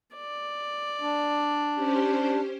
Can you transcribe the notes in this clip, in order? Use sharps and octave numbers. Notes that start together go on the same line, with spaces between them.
D5
D4
C#4 G4 C5